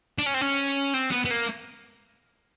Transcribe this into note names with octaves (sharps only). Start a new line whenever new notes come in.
D4
C#4
C4
C#4
C4
B3
B3
A#3